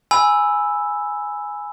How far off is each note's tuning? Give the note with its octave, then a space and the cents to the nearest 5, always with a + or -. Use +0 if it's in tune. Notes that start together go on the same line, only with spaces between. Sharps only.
G#5 +0 B5 +0 E6 +0